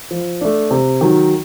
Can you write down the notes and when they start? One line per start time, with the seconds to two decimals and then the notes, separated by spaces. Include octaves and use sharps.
0.11 F3
0.41 A3 D4
0.71 C3
1.01 D#3 F#3